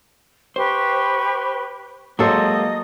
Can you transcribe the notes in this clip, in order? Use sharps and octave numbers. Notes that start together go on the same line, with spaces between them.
G4 B4 C5 C#6
F#3 G#3 A#3 A4 C5 D#5 D#6